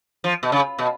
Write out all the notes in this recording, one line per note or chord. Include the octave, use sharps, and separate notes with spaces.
F3
B2
C#3
B2